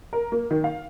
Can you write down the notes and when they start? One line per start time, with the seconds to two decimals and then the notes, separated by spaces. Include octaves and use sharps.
0.13 A#4
0.32 A#3
0.51 D#3
0.64 F5